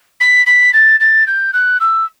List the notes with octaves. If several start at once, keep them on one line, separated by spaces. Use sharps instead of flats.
B6
B6
A6
A6
G6
F#6
E6